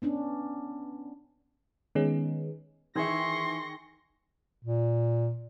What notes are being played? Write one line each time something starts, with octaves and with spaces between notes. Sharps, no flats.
B3 C#4 D4
D#3 G#3 B3 C#4 D#4 G#4
D#3 E3 G#4 E5 C6 C#6 A#6
A#2